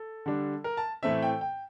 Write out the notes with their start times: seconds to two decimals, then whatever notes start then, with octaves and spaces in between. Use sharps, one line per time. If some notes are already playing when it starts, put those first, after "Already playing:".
Already playing: A4
0.26 D3 G3 D4
0.64 A#4
0.77 A5
1.03 A2 E3 A3 C4 E5
1.22 G5
1.41 G5